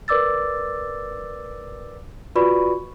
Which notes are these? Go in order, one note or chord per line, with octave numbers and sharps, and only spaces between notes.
A#4 B4 D5 D6 E6 A6
F4 F#4 B4 D5 B5 C#6